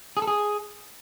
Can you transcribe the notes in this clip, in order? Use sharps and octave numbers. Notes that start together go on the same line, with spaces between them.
G#4
A4
G#4